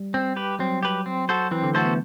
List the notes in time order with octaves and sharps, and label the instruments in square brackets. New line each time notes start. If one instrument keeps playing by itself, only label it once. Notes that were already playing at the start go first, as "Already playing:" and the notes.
Already playing: [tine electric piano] G3
[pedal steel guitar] C4
G4 B4
[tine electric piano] F#3 [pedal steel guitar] C4
[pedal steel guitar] G4 B4
C4
F#4 A4 C5
[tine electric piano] E3 [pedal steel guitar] C4
[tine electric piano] D3
[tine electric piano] A3 [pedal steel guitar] F#4 A4 C5
[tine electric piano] B3